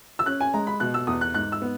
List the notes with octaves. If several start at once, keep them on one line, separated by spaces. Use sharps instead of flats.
E6
C#4 F#6
G#5
G#3 A#5
B5
B2 F#6
E6
E2 D#6
F#6
G#2 F#6
E6
B3